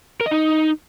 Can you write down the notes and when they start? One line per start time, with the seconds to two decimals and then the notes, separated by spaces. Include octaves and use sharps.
0.21 A#4
0.26 D#5
0.32 D#4